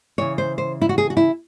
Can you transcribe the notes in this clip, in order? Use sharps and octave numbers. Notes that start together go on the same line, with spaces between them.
C#3 E3 C#5
C5
C5
E4
F#4
G#4
F#4
E4